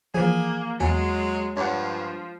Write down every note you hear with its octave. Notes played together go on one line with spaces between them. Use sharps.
E3 F3 A#3 G#4
E2 F#3 G#3 G#5
G2 F3 C#5 F#5